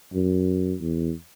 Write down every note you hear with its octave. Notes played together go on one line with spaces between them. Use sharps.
F#2
E2